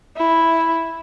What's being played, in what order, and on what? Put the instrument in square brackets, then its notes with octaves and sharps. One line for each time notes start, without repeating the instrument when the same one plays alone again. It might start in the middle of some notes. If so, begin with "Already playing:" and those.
[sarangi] E4